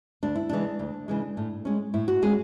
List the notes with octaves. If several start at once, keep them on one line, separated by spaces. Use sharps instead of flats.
D2 D4
E4
C#3 E3 G#3 D4
D2
C#3 E3 G#3
A2
G#3 C#4
A2 E4
F#4
G#3 C#4 G#4